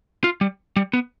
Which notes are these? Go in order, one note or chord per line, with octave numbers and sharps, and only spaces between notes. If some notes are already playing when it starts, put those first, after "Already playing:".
F4
G3
G3
B3